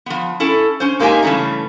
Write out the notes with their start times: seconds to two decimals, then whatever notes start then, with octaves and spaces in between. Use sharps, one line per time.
0.06 F3 B3
0.40 C#4 E4 A4
0.80 C#4 C5
0.99 G#3 A#3 D#4 G4 E5 G#5
1.23 G2 C#3 E3 A3 C#4